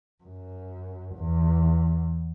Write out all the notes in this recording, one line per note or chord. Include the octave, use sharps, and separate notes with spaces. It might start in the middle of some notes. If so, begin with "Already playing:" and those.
F#2
E2